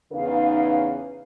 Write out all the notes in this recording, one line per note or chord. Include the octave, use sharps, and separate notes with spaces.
E2 C#3 D#4 B4 F5